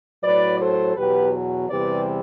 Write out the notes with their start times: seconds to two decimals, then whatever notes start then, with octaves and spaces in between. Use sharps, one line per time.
0.23 A2 F#3 B4 D5
0.60 A4 C5
0.97 E2 B2 F#3 G4 B4
1.70 E2 C3 E3 G3 B4 D5